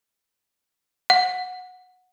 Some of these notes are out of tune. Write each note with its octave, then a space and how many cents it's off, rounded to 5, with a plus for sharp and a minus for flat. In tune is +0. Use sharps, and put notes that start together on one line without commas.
F#5 -15